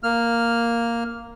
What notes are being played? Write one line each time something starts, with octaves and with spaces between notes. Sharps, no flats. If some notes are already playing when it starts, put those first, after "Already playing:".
A#3 F6